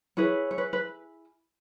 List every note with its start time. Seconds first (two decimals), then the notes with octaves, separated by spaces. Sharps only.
0.17 E4 G#4 B4 C#5
0.51 C#5
0.58 B4
0.73 B4